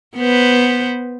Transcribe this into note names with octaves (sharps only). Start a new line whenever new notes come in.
B3 B4 C5